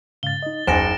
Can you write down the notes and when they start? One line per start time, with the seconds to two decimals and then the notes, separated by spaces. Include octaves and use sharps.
0.23 G#2 C#3 F5 A6 G7
0.43 D#4 D#5
0.67 F#1 D#4 C5 F#5 G#5 A#6 D7 E7